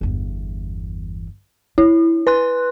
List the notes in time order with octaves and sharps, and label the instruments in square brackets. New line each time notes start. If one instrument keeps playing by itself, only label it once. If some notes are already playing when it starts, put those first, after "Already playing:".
[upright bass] G1 E2
[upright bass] D4 [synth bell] E4
[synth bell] B4 C6 F#6